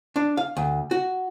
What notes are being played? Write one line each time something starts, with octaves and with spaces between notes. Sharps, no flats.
D4
F5
D2
F#4